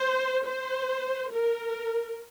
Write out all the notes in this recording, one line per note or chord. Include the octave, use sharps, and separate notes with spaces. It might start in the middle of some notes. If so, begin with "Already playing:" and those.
Already playing: C5
C5
A#4